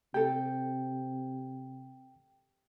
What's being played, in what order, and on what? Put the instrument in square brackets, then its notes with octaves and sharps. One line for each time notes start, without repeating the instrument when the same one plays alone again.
[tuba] C3 [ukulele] G4 A4 [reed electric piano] G5